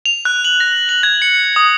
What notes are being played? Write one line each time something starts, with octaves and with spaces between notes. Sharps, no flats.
F7
F#6
F#7
A#6
F#7
G#6
C#7
D#6